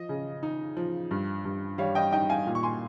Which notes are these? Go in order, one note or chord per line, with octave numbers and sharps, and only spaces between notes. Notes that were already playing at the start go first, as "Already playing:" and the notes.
Already playing: F3 D#5
C#3
D#4
F3
G2
G2
G3 C#5 F5
D#5 G5
D#4 D#5 G5
F5 G#5
A#2
C#6
G#5 C6